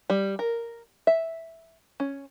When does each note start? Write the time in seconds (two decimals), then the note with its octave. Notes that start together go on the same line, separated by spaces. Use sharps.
0.10 G3
0.39 A#4
1.07 E5
2.00 C#4